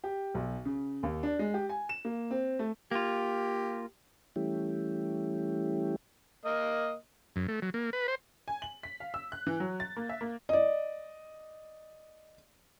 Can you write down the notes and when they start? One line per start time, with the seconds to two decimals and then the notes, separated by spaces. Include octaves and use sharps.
0.04 G4
0.34 B1
0.65 C#3
1.03 D#2
1.23 D4
1.39 G#3
1.54 G4
1.69 G#5
1.89 E7
2.05 A#3
2.31 C4
2.59 A3
2.91 A#3 F4 G4
4.36 E3 G3 A3 C#4 E4 G4
6.45 A#3 D#5
7.36 F#2
7.48 A3
7.62 F#3
7.74 A#3
7.93 B4
8.08 C5
8.48 G#5
8.62 F#7
8.83 B6
9.00 F5
9.14 E6
9.32 F#6
9.47 E3
9.60 F#3
9.80 A6
9.96 A#3
10.09 E5
10.21 A#3
10.49 D5 D#5